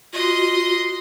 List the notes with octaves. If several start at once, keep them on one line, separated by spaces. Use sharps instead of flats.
F4 F#4 D#5 C6